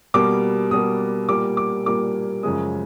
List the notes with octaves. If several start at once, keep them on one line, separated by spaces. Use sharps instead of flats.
B2 G3 A#3 D6
B2 G3 A#3 D#6
A#2 G3 A#3 D6
D6
A#2 G3 A#3 D6
F#2 C#3 F3 G#3 D#6